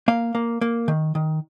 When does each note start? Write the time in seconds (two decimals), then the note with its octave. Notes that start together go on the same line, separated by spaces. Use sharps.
0.08 A#3 F5
0.35 A#3
0.61 A#3
0.88 D#3
1.15 D#3